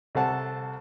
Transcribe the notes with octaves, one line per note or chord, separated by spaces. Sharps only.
C2 A4 C5 F#5 A5